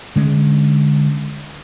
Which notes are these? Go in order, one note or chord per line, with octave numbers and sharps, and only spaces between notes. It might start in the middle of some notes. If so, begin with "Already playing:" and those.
D3 G#3 C#4